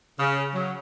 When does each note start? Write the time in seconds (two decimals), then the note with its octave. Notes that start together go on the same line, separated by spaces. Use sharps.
0.20 C#3
0.55 F#3